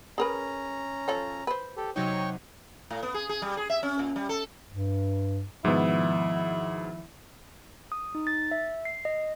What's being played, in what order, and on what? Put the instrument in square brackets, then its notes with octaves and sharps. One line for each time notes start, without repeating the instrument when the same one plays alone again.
[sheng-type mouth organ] C#4 A#5 [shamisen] G#4 A#4 B4
[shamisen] F3 A4 C#5
B4 C5
[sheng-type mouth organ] G4 A4
[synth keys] C3 F#3 D#4 [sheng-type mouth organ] C#5 G5 C#6
[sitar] A2
B3
G#4
G#4
G3
G#4
E5
C#4
A#2
G3
A4
[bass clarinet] G2
[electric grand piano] G#2 B2 B3 [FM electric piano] D#3 F3 [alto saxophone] E4
[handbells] D#6
D#4
A6
E5
C7
D#5